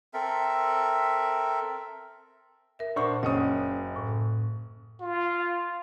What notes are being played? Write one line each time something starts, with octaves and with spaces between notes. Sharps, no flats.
C4 A4 A#4 E5
A#4 E5
A#2 D4 C5 F#5 B5 C#6
F#1 C#4 C#5 D#5 D#6
A2
F4